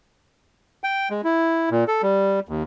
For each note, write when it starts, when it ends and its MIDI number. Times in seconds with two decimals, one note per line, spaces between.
0.84 1.09 79
1.10 1.21 56
1.24 1.69 64
1.71 1.84 46
1.88 2.02 69
2.02 2.40 55
2.49 2.63 39